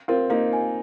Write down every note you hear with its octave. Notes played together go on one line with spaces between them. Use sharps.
C4 F4 A#4
A#3 D#4 F5
G#5